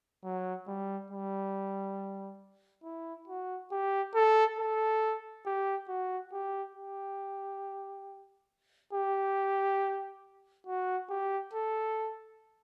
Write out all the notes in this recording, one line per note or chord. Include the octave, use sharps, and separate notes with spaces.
F#3
G3
G3
E4
F#4
G4
A4
A4
G4
F#4
G4
G4
G4
F#4
G4
A4